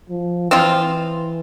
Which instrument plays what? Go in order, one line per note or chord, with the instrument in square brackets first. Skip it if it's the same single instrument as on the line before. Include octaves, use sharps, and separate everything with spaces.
[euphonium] F3
[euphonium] E3 [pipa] F3 C4 F4